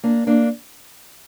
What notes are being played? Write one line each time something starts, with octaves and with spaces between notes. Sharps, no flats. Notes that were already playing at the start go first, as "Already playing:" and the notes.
A#3 D4
A#3 D4